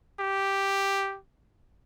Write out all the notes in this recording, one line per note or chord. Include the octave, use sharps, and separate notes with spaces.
G4